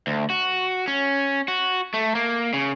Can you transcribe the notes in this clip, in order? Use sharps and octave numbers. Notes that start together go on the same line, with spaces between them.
D2
F#4
C#4
F#4
A3
A#3
C#3